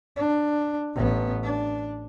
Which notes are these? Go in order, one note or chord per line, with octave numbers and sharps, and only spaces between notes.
D4
A1 B3
D4